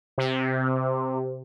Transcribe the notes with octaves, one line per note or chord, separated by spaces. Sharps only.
C3